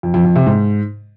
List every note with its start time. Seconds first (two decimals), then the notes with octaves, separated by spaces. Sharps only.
0.03 F2
0.14 F2
0.25 F2
0.36 C3
0.46 G#2